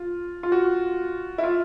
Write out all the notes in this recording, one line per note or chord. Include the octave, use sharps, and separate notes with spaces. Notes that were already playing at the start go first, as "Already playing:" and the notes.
Already playing: F4
F4
F#4
E4
F4